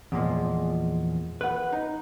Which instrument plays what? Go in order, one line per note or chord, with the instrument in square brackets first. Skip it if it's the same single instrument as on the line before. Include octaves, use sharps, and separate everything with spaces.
[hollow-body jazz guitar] E2 A#2 F3 G#3
B4 F#5
D#4